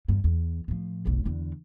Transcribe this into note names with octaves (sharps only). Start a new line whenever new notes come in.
E2 G2
E2
A2 F3
F1 B1
E2 D3